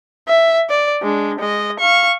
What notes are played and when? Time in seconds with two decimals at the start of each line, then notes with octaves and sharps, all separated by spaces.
0.28 E5
0.70 D5
1.02 G#3 D4
1.39 G#3 D#5
1.80 F5 C#6